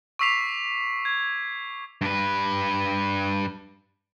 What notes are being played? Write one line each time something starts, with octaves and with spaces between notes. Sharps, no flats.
C#6 D6 E6 B6 C7 F7
G#6
G2 B4